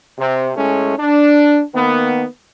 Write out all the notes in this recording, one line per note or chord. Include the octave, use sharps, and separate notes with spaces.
C3
A2 G#3 A3 C#4
D4
D#3 A#3 B3